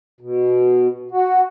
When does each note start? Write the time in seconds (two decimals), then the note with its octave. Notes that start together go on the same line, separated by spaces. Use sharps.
0.21 B2
1.11 F#4